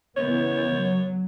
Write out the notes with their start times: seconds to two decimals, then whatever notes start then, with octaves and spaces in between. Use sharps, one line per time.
0.17 C#3 E3 B3 C#5
0.77 F#3